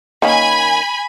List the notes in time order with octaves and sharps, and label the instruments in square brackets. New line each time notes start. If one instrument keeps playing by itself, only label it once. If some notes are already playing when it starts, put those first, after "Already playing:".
[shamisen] D#3 A#3 C#4 [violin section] G#5 B5